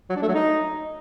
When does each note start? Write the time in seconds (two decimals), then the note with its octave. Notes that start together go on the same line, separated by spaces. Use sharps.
0.09 F#3
0.15 D4
0.22 A3
0.28 F#3
0.34 D#4